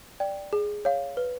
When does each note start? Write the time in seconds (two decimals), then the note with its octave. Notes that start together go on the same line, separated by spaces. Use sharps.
0.20 D5 G5
0.53 G#4
0.85 C#5 F5
1.17 B4